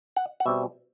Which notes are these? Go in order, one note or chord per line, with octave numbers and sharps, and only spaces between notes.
F#5
F#5
B2 G3 C4 E5